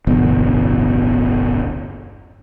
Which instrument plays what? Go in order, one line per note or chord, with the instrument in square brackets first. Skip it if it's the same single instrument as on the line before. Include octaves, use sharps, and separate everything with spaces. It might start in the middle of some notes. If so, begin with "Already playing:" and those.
[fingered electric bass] D1 G1 E2 B2